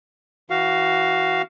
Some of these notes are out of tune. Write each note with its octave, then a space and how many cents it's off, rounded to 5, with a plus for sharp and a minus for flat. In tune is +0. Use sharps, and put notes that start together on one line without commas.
E3 -10 F#4 +15 F5 +0